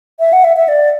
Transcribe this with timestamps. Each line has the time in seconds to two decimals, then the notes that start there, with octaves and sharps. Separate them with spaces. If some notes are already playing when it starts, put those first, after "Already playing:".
0.20 E5
0.33 F#5
0.44 E5
0.57 E5
0.68 D5